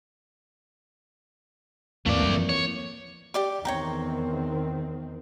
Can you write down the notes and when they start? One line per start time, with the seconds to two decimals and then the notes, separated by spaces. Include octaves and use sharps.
2.06 D#2 G#2 E3 A3 A#3 C4 D5
2.21 D1 F#2 G3
2.37 F3
2.49 C#5
3.34 G4 D5 D6
3.65 E2 D#3 C4 C#5 G5 A#5